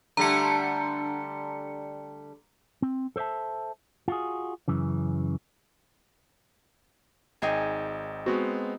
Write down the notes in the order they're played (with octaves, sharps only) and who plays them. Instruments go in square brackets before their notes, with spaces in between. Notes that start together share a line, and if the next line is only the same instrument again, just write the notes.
[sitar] D3 G3 A3 [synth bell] A#5 C#7
[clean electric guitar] C4
A4 C5 D5 E5 A5
F4 F#4 G#4
F#2 C#3 E3
[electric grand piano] G#1 G5 [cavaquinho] D#4 G#4 G#5
[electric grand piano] G#3 B3 C4 [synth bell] F#4